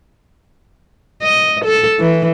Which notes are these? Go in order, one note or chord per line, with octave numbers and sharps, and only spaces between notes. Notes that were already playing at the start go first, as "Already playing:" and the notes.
D#5
A4
E3